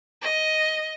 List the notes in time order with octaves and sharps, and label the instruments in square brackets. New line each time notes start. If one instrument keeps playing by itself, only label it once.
[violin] D#5